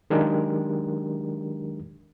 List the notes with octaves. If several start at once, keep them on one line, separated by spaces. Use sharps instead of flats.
D#3 F#3 G#3 D4 G4 A#4